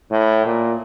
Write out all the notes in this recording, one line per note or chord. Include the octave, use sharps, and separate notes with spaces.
A2
A#2